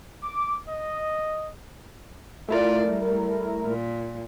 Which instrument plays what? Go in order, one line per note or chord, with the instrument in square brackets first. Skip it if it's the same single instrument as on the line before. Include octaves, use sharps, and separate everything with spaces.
[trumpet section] D6
D#5
[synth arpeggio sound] A3 E4 A#4 [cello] F4 D5
[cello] G3
A#2